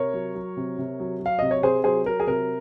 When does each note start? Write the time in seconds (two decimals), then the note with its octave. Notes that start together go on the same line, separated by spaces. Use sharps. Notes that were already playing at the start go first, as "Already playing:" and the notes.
Already playing: C3 A#4 C#5
0.14 F#3
0.35 F#3
0.57 C3
0.78 C3
1.00 F#3
1.20 F#3
1.26 F5
1.39 C3 D#5
1.51 C#5
1.63 C3 G#4 C5
1.84 F#3 G#4 C5
2.05 F#3 A#4
2.20 G#4
2.27 C3 A#4